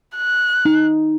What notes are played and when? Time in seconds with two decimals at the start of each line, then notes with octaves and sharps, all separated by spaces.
0.16 F#6
0.65 D#4